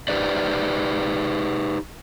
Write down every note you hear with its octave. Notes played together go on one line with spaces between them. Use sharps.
D#4 G4 B4 C5 D5